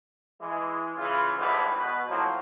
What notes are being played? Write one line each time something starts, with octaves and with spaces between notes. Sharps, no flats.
E3 G#3
C#3 E3 F4
G#1 D2 E3 G3 G#3 B4
B2 B4
A2 F3 F#3 A#3 C4